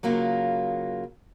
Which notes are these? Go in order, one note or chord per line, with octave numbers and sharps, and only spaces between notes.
C#3 F#3 A#3 F4